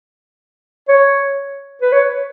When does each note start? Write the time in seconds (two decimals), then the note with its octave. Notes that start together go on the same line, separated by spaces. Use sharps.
0.88 C#5
1.82 B4
1.92 C#5